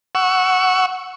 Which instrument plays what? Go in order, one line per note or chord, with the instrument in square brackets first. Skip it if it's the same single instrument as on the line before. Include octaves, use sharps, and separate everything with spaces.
[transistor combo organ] F#5 C#6 E6